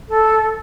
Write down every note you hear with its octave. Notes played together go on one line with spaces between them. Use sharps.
A4